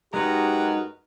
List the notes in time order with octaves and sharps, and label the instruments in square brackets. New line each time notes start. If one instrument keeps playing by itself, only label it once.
[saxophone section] F#2 A#4 B4 [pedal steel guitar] G#3 D#4 F#4 [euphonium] G4